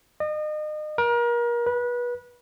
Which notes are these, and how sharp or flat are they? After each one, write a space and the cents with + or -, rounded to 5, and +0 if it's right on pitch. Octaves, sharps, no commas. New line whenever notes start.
D#5 -35
A#4 +35
B4 -25